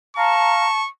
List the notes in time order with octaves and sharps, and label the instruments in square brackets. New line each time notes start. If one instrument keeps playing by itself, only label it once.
[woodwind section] F5 A#5 [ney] A5 [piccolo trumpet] C#6